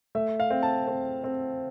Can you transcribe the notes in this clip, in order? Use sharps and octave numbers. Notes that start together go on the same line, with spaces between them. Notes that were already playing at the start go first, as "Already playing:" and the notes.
A3 E5
F5
C4
A5
C4
C4